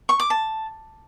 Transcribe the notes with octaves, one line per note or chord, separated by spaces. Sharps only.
C#6
D6
A5